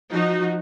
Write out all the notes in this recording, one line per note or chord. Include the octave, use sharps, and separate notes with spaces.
F3 D#4 F#4